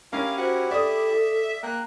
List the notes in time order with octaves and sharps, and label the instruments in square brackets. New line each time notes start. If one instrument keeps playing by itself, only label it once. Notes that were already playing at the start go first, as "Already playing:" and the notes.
[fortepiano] C#4 A#4 [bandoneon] E4 G4 [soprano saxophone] F5
[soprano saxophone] F#4 [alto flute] C5
[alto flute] A4 [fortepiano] D5 D#6 [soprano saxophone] E5
[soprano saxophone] A#3 [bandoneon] G5 F#6 [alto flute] A#5